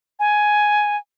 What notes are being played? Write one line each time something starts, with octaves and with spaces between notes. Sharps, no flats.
G#5